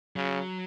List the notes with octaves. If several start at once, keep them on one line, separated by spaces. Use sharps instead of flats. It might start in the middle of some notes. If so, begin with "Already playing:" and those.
C#3 F#3